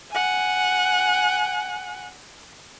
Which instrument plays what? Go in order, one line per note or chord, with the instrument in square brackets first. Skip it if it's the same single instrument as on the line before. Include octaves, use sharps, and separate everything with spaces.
[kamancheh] F#5 G#5